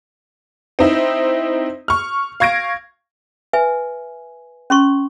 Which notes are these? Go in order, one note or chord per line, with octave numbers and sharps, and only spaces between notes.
C4 D#4 E4
C#6 F6
F5 C#6 G#6 A#6 D7
B4 E5 G#5
C#4 C6 C#6